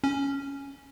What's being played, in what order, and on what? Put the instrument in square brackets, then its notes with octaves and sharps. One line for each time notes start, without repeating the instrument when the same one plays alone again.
[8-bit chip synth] C#4